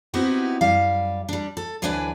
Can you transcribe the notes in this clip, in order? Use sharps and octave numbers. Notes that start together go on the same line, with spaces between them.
B3 C4 D#4 E4 F#4 G4
F#2 G3 F5
G3 D4
A4
D2 E3 F#3 D4 B4 G#5